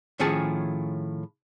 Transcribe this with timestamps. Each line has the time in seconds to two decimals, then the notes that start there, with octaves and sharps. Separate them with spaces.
0.19 A2 D#3 F3 C#4 G#4 A5